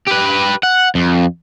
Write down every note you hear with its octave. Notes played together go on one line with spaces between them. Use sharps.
G4 B4
F#5
F2